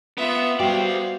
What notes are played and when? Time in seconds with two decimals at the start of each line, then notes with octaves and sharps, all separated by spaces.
0.18 B3 F4 E5
0.59 G3 B3 F#4 C5 D5 F5 G5